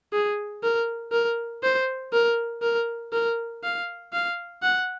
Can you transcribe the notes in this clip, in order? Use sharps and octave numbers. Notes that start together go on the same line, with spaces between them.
G#4
A#4
A#4
C5
A#4
A#4
A#4
F5
F5
F#5